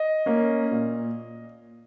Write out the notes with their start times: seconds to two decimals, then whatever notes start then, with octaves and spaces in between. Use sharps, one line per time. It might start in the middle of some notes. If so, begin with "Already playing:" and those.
Already playing: D#5
0.26 A#3 C#4
0.71 A#2